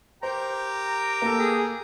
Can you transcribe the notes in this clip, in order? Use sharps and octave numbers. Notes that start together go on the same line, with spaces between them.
G4 A#4 C5 G5 A#5
A#3 A4
G#4